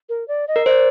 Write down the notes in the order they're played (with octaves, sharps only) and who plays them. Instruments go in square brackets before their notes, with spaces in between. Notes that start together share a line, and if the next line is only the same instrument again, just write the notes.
[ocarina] A#4
D5
D#5
[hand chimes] A#4
[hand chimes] C5 [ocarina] D5 D#5